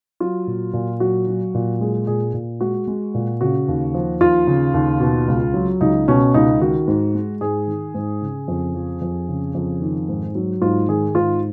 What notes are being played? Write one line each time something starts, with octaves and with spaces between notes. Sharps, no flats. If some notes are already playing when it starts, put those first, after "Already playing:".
F#3 F4
A#2
A#2
F#3 F#4
F#3
A#2
G#3 G#4
A#2 G#4
A#2
G#3 F#4
G#3
A#2
C#3 F#4
D#2
F3
D#2 F4
C#3
D#2
B2
C#2
F#3
C#2 D#4
B2 C#4
C#2 D#4
D#3 F#4
G#2
G#3
G#2 G#4
D#3
G#2
C#3
F2
F3
F2
C#3
F2
D#3
G#2
F#3
G#2 F4
D#3 G#4
G#2 F4